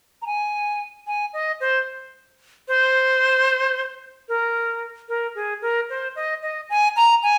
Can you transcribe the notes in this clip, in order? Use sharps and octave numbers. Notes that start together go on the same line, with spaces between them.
A#5
G#5
G#5
D#5
C5
C5
A#4
A#4
G#4
A#4
C5
D#5
D#5
G#5
A#5
G#5